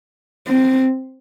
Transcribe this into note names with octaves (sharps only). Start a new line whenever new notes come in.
C4